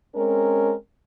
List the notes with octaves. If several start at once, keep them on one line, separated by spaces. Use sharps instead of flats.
G#3 C4 C#4 A#4